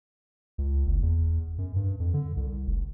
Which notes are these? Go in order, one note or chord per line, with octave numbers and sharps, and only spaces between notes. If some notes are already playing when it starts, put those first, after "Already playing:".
C#2
F#1
E2
F#2
G2
F2
D3
C2
F1